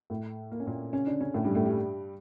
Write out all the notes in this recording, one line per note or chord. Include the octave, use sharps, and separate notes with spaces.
A2 A3
A#3
C#4
A#2 A#3
C#3 C#4
D3 D4
C#3 C#4
A2 A3
G2 G3
A2 A3
G2 G3